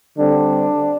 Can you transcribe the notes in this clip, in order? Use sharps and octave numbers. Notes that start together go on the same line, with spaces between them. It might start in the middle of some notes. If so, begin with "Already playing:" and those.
D3 G3 C4 D4